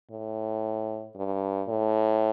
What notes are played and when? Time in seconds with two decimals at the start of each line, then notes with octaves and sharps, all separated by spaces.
0.11 A2
1.16 G2
1.69 A2